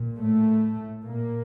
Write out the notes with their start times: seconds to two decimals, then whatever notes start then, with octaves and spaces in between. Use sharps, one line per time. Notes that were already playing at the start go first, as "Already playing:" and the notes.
Already playing: A#2
0.17 A2 A3
1.04 A#2 A#3